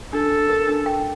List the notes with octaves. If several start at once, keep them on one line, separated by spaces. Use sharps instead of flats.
D4 A4
D4
A#4
D4
G5